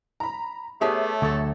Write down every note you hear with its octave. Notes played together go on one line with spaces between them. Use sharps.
A#5 B5
A3 B3 G4 G#4 C#5 E5 A5
D2 F#3 A4